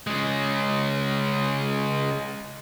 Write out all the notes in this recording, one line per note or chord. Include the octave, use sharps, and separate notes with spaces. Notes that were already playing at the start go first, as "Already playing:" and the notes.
C#3 G#3